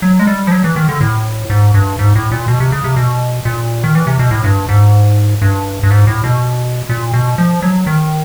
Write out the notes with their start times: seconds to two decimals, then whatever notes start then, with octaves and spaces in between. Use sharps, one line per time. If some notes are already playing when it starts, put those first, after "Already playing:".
0.02 F#3
0.19 G#3
0.27 G3
0.47 F3
0.52 F#3
0.64 E3
0.76 D#3
0.89 D3
1.01 A2
1.50 G#2
1.74 G2
1.99 G#2
2.15 A2
2.32 A#2
2.48 B2
2.60 C3
2.72 C#3
2.84 C3
2.97 B2
3.45 A#2
3.84 D#3
3.95 E3
4.07 C3
4.19 B2
4.31 A2
4.44 G2
4.69 G#2
5.42 G2
5.83 G2
5.91 G#2
6.07 A2
6.24 B2
6.89 A#2
7.14 B2
7.38 F3
7.62 F#3
7.87 D#3